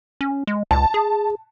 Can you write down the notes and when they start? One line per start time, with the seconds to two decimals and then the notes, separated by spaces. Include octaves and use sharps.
0.21 C#4
0.47 G#3
0.71 C#2 A5
0.94 G#4